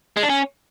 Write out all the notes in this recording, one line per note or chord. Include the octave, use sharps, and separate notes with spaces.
G#3
D4
C#4